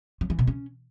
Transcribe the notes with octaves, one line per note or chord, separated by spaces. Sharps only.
F3
E3
B2
C#4